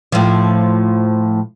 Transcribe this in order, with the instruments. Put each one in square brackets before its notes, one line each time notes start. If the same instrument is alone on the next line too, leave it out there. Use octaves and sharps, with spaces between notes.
[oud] A2 F3